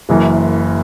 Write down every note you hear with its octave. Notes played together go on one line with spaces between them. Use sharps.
F#1 F#2 E3